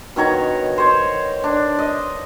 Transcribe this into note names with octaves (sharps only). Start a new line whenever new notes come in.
B2 D#3 C#5 A#5
C5 C#5
D4
D#5